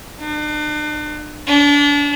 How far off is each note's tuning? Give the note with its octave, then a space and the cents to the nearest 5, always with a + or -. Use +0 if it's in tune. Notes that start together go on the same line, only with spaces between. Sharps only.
D4 +40
D4 -35